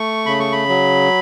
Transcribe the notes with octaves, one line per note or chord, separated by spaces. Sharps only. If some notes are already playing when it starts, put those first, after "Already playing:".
Already playing: A3 C#6
C#3 B5
C#6
B5
F#3